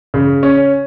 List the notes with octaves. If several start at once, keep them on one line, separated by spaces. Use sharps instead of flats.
C#3
C#4